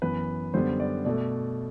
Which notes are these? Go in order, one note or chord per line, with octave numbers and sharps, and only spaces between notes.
F#2 E3 B3 B4
F#2 D3 G3 B3 C5
D5
B2 A3 D5